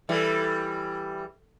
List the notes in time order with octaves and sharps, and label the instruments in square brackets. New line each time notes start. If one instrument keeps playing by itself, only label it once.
[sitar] E3 G3 [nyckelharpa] A4